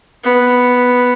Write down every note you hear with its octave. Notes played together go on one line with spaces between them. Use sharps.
B3